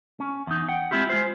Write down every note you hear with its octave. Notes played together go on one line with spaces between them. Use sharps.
C#4
E2 D#4
F#5 G5
G#3 C4 E4 F4 G4
G#3 F4 C5